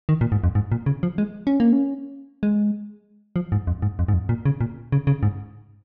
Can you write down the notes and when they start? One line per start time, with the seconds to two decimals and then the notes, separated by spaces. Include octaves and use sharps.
0.09 D#3
0.21 A#2
0.32 G#2
0.44 F2
0.55 G#2
0.72 A#2
0.86 C#3
1.03 F3
1.18 G#3
1.47 C#4
1.60 A#3
1.73 C#4
2.43 G#3
3.36 F3
3.52 G#2
3.67 F2
3.82 G#2
3.99 F2
4.08 G#2
4.14 F2
4.29 A#2
4.46 C#3
4.61 A#2
4.92 C#3
5.07 C#3
5.23 G#2